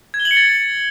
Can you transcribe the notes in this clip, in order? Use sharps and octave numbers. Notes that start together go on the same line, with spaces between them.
G#6
G7
F#7
C#7
A6